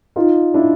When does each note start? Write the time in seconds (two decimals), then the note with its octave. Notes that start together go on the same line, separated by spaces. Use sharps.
0.16 D#4 F4
0.54 D4 E4